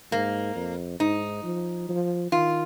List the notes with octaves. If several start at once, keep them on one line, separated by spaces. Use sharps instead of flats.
G#2 A#3
F2
G#2 D#4
F3
F3
D#3 F4